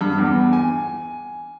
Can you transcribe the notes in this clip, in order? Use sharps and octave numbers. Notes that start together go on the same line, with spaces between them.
G2
E2
G#5